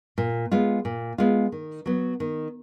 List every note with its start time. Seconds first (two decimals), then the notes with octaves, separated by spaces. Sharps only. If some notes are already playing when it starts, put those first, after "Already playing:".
0.18 A#2
0.52 G#3 B3 F4
0.85 A#2
1.18 G#3 B3 F4
1.52 D#3
1.86 F#3 B3
2.20 D#3